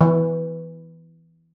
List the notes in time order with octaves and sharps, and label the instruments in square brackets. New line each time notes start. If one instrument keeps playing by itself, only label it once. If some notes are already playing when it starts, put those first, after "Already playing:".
[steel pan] E3